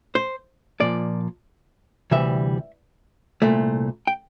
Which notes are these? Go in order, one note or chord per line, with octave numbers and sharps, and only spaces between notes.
C5
A#2 F3 A#3 D5
D2 C3 E3 G3 E5
C2 A#2 A3
G5